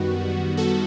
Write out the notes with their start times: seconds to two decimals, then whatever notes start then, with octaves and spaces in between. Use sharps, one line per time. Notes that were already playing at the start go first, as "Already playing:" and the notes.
Already playing: F#2 D#3 G3 B3 F#4
0.57 F#4 A4